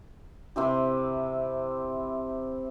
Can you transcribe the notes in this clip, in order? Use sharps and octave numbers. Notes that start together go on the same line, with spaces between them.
C3 C4 E4 G4